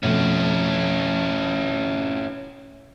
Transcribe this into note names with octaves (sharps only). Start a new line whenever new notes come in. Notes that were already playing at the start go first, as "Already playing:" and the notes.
F2 B2 A3 C#4 E4